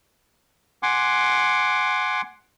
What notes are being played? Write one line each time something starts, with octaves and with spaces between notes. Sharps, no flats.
F#5 G#5 C6 D6